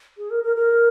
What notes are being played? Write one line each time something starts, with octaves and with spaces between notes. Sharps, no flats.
G#4
A#4
A#4
A#4